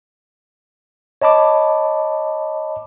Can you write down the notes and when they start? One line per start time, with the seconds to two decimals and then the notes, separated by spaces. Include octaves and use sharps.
1.22 C#5 D#5 A5 B5 D6